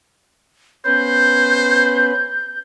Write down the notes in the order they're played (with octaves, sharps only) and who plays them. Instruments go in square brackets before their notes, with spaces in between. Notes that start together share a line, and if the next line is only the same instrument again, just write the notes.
[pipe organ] B3 C#4 B4 [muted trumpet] C5 [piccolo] G6